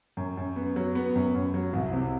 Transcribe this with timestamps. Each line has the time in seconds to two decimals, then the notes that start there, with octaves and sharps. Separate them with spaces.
0.17 F#2
0.37 F#2
0.56 B3
0.76 F#3
0.95 B3
1.16 F#2
1.34 F#2
1.54 F#3
1.73 C2
1.93 C3